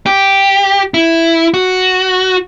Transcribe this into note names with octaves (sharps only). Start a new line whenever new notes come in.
G4
E4
F#4